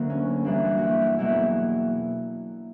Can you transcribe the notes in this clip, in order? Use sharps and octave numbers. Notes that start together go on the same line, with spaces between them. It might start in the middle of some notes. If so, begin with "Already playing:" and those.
Already playing: D2 D3 F#3 A#3
C#4
G2 E3 A#3 D4
F#4
E4 F#4
E4
E2 B2 F#3 A#3 E4